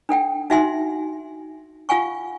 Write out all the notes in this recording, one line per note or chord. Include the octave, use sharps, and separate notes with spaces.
D4 A4 F#5 G5
D#4 F#4 E5 F#5 G#5 C6
F4 F5 F#5 G#5 C#6